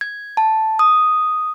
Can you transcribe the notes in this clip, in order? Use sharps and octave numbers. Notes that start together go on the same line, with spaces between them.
G#6
A5
D#6